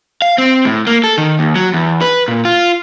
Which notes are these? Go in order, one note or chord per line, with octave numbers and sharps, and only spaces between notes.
F5
C4
A2
A#3
A4
D#3
D#2
F#3
E2
B4
A#2
F4